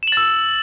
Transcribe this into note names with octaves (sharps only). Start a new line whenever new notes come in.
E6 A6 E7 F#7